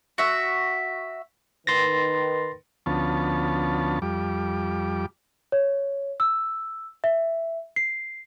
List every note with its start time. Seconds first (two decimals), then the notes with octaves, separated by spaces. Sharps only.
0.18 F#4 E5
1.67 D#3 B4 C6 A6 A#6
2.86 D2 F3 B3 C#4 A5
4.02 F2 G3 D6
5.52 C#5
6.20 E6
7.04 E5
7.76 C7